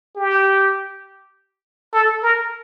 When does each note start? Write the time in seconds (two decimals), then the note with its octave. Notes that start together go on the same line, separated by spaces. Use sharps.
0.16 G4
1.94 A4
2.23 A#4